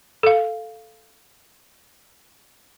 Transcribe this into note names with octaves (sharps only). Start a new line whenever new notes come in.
A4 F5